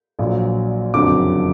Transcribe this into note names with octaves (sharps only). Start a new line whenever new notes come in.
A#1 A#2 F#3
F#1 F2 D3 F#3 D6